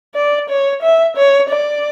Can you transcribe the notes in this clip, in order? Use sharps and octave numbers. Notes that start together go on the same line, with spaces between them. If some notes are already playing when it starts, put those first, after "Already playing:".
D5
C#5
E5
C#5
D5